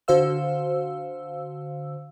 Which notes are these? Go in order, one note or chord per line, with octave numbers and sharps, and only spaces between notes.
D3 F#4 C5 F5 E6